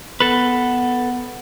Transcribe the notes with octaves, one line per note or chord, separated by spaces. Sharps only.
B3 A4 B4